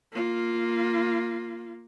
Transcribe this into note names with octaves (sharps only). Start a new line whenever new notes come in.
A#3 F4